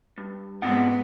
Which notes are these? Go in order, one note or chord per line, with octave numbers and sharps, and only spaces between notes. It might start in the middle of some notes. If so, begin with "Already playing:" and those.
G2
B1 G#2 G#3 B3 C4 F#5